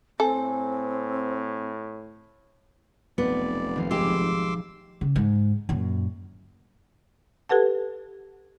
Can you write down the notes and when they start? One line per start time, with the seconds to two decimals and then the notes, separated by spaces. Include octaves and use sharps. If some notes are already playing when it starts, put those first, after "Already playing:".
0.20 A2 C4 A4 G#5
3.18 F1 B1 B3 D5
3.76 G#1 F3 F5
3.91 G#3 G4 C6 D6 E6
5.01 C#3
5.16 G#2
5.69 F#2 A#2
7.49 G4 A4 B4 F#5 A5